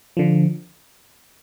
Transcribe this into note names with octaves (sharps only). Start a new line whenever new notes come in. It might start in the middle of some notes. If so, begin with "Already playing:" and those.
D3 F3